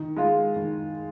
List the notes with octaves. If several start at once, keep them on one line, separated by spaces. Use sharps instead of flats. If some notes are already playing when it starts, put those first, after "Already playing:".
Already playing: D#3
G#3 F4
D#3